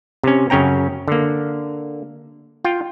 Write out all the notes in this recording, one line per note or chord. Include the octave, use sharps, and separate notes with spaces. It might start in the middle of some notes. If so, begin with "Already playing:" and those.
C3 C#4
F#2 C#3 C#4 G5 A#5
D3 A#3
F4 G5